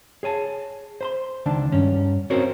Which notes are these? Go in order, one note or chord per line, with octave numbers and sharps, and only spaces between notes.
G#4 C#5 G#5 A5
C5 B5 C6
C#2 D#3 D4 A5
G2 C#4
C4 C#4 F#4 A#4 C5 C#5